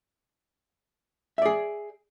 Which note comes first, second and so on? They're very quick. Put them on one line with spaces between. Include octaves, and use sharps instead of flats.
E5 D5 G#4